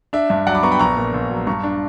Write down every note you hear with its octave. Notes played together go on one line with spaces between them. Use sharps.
D4 E5
G2 E5
F#3 D5 F#5
B5 D6
B3 A#5 C#6
G5 B5
A#1 A#5 C#6
A#2
A#1
F#3
G2 A#5 C#6
D4